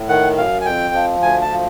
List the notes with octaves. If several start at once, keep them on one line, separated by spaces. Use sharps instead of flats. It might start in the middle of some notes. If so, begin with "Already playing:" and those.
Already playing: A2
D#3 F#5
F#2 F5
G#5
F2 G5
F3
D2 G#5
A5
F3